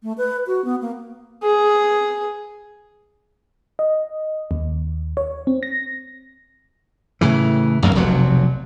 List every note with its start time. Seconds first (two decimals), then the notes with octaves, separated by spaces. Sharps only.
0.03 A3
0.18 B4
0.47 F#4
0.65 B3
0.81 A#3
1.43 G#4
3.79 D#5
4.51 D#2
5.17 C#5
5.47 C4
5.63 A#6
7.21 A2 C#3 E3
7.82 C#2 F#2 F#3 A#3
7.95 F1 B1 C3 F#3